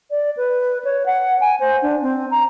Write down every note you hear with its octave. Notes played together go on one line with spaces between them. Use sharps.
D5
B4
C#5
F#5
G#5
C5
D4
C4
A#5